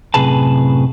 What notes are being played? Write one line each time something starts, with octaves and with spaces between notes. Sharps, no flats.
F#2 A2 C3 G#4 B4 A5